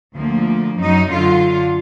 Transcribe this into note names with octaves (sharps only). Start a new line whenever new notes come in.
D2 F3 A#3
F#2 F#3 D#4
F#2 D3 F4